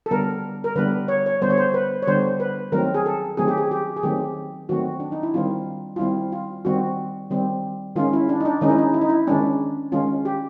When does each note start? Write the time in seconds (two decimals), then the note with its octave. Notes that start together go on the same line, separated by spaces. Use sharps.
0.06 A4
0.11 D3 G3 B3 A#4
0.64 A#4
0.76 D3 G3 B3 B4
1.08 C#5
1.26 C#5
1.42 D3 G3 B3 C5
1.50 C#5
1.58 C5
1.74 B4
2.02 C#5
2.07 D3 G3 B3 C5
2.40 B4
2.72 D#3 F#3 A3 C4 A#4
2.94 G#4
3.06 A4
3.37 D#3 F#3 A3 C4 G#4
3.48 G4
3.58 G#4
3.71 G4
3.97 G#4
4.03 D#3 F#3 A3 C4 G4
4.69 D#3 F#3 A3 C4 F#4
5.00 D4
5.12 D#4
5.23 E4
5.34 D#3 G3 C4 F4
5.96 F4
5.99 D#3 G3 C4 E4
6.32 F4
6.65 D#3 G3 C4 F#4
7.30 D#3 G3 C4
7.96 D#3 G#3 C#4 F4
8.13 E4
8.29 D4
8.41 D#4
8.45 D4
8.61 D#3 G#3 C#4 D#4
8.70 E4
8.78 D#4
8.94 E4
9.01 D#4
9.09 E4
9.27 D#3 G#3 C#4 D4
9.92 D#3 G#3 C#4 F4
10.25 G4